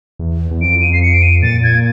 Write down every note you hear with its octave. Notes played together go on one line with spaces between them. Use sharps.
E2
E2
F2 D7
D#7
C7
C#7
D7
D#7
A#2 A6
G#6